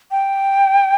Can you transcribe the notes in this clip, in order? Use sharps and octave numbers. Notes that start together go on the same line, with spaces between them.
G5